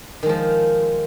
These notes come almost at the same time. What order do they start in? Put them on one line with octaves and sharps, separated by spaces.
D#3 G#3 F3